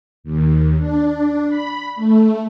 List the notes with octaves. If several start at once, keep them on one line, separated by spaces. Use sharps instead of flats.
D#2
D4
B5
A3